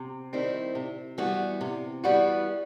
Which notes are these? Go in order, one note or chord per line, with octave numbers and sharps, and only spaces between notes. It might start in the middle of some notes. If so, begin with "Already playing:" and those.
Already playing: C3
D#3 G3 C4 E4
C3
E3 G3 B3 F#4
C3
E3 G3 B3 F#4